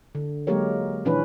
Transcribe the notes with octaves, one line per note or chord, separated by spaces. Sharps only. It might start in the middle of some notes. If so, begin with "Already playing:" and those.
D3
F#3 G#3 A#3 G4 A#4 C#5
A#2 D#3 E3 C#4 D4 B4